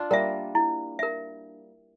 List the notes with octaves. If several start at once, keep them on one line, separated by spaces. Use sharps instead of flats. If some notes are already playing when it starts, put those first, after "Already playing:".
Already playing: D4 F4
G3 A#3 A#4 E5
E4
A#4 E5